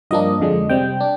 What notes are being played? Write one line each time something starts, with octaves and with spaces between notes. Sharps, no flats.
G2 F3 A#3 D4 D#5
F2 D3 F3 G#3 D4
C3 G3 C4 G5
D4